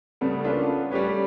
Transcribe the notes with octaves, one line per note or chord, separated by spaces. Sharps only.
C#3 G3 A3 B3
A#3 C#4 D4 F4 A4 B4
B3
G3 A3 C#4 G4 B4 C#5